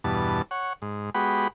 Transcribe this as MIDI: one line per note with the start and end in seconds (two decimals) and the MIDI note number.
0.04 0.42 40
0.04 0.42 43
0.04 0.42 47
0.04 0.42 81
0.51 0.73 73
0.51 0.73 78
0.82 1.10 44
1.14 1.48 56
1.14 1.48 59
1.14 1.48 66
1.14 1.48 67
1.14 1.48 83